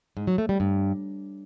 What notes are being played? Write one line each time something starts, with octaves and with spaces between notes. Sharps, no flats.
G#2
F#3
A3
G3
G2